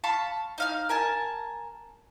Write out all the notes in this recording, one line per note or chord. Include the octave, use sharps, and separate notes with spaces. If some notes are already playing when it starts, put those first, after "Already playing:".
F5 A5 B5 C#6
D#4 F5 F6
A#4 G#5 A5